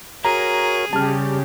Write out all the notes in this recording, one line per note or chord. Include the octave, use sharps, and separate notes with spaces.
F#4 G#4 A#4 C#5 A#5
C#3 G3 G4 A5 F6